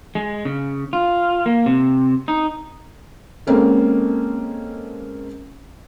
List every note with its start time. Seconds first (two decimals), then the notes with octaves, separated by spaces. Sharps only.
0.15 G#3
0.45 C#3
0.93 F4
1.46 A#3
1.66 C3
2.28 D#4
3.47 G#3 A#3 C4 C#4 A4